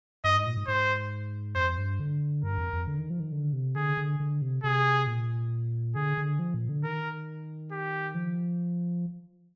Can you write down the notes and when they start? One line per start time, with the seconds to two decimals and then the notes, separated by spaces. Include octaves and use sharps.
0.24 G2 D#5
0.35 G#2
0.46 A#2
0.57 G#2
0.67 G#2 C5
1.55 F2 C5
1.78 G2
2.00 D3
2.43 G2 A#4
2.58 F2
2.73 F2
2.87 D3
2.99 D#3
3.10 F3
3.20 D#3
3.32 D3
3.53 C3
3.76 D3 G#4
3.97 D3
4.20 D3
4.42 C3
4.64 C3 G#4
5.07 A#2
5.95 D3 G#4
6.17 D3
6.39 F3
6.54 A#2
6.69 D3
6.83 D#3 A#4
7.72 G4
8.15 F3